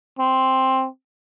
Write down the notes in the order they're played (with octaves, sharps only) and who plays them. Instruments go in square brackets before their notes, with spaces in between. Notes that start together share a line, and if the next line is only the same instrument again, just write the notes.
[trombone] C4